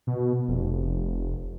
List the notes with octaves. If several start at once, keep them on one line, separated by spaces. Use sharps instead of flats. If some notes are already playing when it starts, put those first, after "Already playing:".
B2
F1